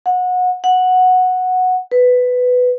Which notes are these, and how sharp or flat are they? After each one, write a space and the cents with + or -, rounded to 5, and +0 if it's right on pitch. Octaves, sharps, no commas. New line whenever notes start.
F#5 -25
F#5 -5
B4 +10